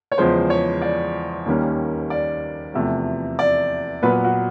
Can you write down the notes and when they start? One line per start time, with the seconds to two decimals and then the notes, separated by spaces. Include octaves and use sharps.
0.12 C#5
0.18 E2 C#3 F3 G#3 C5
0.50 C#5
0.82 D5
1.46 D#2 D#3 G3 A#3 C#4
2.10 D5
2.74 E2 C3 F3 A3
3.39 D5
4.02 A#2 F#3 B3 B4
4.24 F#4